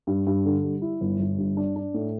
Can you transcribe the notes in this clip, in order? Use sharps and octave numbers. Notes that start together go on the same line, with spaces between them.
G2
G2
D3
G3
E4
G1
G1
G2
D4
D4
A2